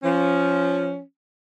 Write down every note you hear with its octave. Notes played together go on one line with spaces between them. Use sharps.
F3 C#4